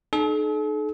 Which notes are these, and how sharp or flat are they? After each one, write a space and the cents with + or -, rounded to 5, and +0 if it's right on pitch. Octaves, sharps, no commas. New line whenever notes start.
D#4 -35 A4 -45